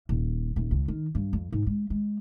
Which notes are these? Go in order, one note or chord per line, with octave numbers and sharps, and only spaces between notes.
D#1
D#1
C#2
D#3
G2
F2
G#2
G#3
G#3